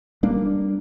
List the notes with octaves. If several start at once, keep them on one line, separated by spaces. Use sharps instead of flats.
G3 A#3 D4